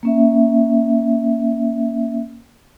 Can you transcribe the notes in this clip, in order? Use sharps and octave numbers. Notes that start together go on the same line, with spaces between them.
A#3 C#4 E5